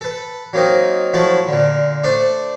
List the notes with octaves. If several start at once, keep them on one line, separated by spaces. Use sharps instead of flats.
A4 B4
F#3 A#3 C4 D#4
F3 F#3 A3 E4 A5 B5
A#2 D3
A3 D4 C5 D5